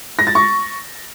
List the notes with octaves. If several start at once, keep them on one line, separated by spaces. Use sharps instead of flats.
A#6
A6
C#6